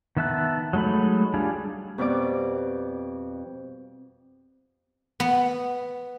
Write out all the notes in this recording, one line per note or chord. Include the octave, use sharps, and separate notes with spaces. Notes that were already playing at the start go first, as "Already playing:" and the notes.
D#3 B3 E5 A5 F#6
F#3 G#3 A3 D#4 B5
G3 D4 F4 G#4
F2 B2 G3 D5 D6
B3